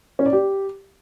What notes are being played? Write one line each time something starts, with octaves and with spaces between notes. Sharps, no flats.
C#4
D5
G4